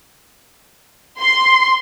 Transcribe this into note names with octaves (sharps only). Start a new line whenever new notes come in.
C6